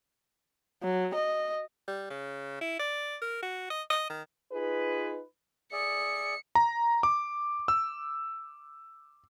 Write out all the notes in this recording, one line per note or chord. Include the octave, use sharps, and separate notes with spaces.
F#3
D#5
G3
C#3
E4
D5
A#4
F#4
D#5
D#5
D#3
D#4 F4 G#4 B4
G#4 D5 E5 C#7
A#5
D6
E6